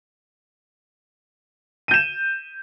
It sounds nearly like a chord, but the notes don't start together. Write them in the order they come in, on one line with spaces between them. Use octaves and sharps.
D#7 G6 E7